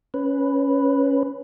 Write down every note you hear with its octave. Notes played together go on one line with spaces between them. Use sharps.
C#4 B4